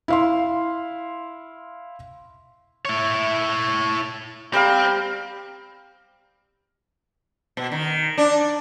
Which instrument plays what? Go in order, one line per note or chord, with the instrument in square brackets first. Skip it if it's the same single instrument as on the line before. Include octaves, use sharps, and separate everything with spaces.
[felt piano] E4 F5 C6
[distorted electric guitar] E4 C#5
[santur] G3 A#4 F5 [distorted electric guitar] C4
[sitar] B2
D#3
D4